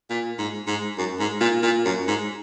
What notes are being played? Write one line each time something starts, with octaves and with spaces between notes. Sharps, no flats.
A#2
G#2
G#2
F#2
G#2
A#2
A#2
F#2
G#2